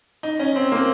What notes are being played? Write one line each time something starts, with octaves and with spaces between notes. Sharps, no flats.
D#4
C#4
C4
A#3